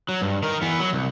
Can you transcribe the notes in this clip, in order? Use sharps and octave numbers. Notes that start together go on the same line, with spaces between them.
F#3
G2
D#3 A#4
E3 B3
F#3
C2